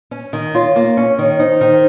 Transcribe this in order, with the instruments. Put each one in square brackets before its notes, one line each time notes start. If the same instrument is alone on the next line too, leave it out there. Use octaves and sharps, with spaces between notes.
[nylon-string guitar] C#4
D#3
[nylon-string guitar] F4 [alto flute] C#5
[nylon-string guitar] A#3
C#4
D#3
[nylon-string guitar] D#4 [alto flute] C5
[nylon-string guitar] D#3